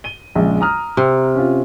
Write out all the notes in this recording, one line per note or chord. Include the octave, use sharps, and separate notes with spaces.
D#7 G7
A#1 C#3 G#3
A#5 D#6 F6
C3
C#4 F4